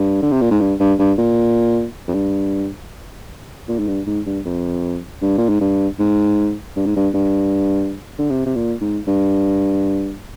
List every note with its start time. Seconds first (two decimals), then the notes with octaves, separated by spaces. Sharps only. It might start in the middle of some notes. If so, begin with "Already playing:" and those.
Already playing: G2
0.22 D3
0.32 C3
0.41 A#2
0.51 G#2
0.61 G2
0.80 G2
0.99 G2
1.18 A#2
2.08 F2
2.14 G2
3.68 A#2
3.79 G#2
3.88 G2
4.07 G#2
4.26 G2
4.45 F2
5.22 G2
5.38 A#2
5.49 G#2
5.61 G2
5.99 G#2
6.76 G2
6.86 G#2
6.96 G2
7.14 G2
8.19 D3
8.30 C3
8.46 C3
8.55 A#2
8.81 G#2
9.07 G2